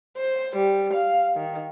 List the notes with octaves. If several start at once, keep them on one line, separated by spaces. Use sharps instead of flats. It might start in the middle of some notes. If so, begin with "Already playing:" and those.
C5
G3
F5
D#3